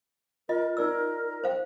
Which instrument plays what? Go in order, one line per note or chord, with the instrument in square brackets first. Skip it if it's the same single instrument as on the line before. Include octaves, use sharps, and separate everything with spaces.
[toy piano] F4 D#5 [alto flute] A#4
[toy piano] D#4 D5 E6 [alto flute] A#4
[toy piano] C5 F5 G5